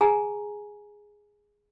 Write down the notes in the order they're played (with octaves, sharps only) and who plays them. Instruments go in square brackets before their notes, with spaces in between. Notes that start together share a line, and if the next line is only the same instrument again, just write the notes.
[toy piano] G#4 G#5 A#5